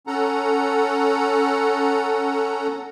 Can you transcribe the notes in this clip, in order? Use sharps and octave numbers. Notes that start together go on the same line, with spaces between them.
C#4 A4 F#5 A#5